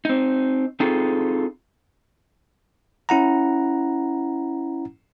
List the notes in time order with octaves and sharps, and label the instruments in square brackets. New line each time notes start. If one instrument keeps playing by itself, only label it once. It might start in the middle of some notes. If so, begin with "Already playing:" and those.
[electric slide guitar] C4 D#4
C4 D#4 F4 G#4 A4
[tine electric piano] C#4 E4 F#5 A#5